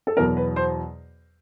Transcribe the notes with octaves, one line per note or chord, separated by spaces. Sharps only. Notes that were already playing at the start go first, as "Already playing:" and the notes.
A4
E2 B2 F#3 A#4
B4
C5